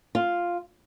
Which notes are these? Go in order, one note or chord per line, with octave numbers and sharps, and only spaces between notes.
F4